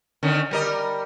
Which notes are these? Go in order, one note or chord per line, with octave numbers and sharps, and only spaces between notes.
D3 D#3 C#4
G3 A#4 D#5